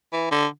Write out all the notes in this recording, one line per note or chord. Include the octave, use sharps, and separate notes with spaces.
E3
D3